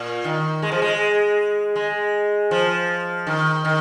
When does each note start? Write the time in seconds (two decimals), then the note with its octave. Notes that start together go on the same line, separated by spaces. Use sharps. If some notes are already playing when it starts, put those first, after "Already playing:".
Already playing: A#2
0.24 D#3
0.62 G#3
0.72 F3
0.82 G#3
1.76 G#3
2.51 F3
3.27 D#3
3.65 D#3